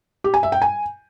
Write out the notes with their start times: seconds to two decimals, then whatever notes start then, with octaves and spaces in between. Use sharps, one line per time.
0.24 G4
0.34 G#5
0.43 E5
0.52 G5
0.62 G#5